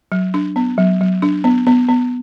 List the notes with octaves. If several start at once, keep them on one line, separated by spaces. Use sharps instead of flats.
F#3
D4
B3
F#3
F#3
D4
B3
B3
B3